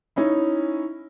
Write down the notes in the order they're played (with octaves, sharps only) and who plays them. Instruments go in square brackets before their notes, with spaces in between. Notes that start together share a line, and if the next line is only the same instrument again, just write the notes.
[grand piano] C#4 D#4 E4